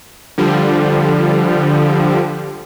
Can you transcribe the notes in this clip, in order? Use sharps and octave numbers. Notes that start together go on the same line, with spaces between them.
D3 F3 G3